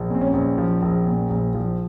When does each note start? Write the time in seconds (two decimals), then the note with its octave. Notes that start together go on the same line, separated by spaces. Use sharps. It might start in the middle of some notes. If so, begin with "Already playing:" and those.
Already playing: A#1
0.10 A#2 C4
0.21 C#4
0.33 A#1
0.58 F3
0.82 A#1
1.06 A#2
1.30 A#1
1.55 F3